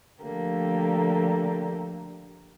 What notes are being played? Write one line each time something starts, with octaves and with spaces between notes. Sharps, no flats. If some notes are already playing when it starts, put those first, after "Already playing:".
D3 F3 A3 A#3 G4